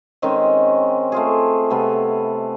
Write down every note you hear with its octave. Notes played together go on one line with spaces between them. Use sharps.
D#3 G#3 C4 C#4
A3 F4 G#4
C3 A3 B3 F4